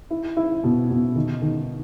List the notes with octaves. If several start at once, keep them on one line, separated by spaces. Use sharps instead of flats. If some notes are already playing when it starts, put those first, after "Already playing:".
E4
E4
B2
B2
D#3
D#3